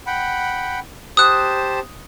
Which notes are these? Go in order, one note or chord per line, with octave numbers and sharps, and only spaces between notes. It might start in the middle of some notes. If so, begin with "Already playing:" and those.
F#5 G5 B5
G4 C5 A5 D#6 F#6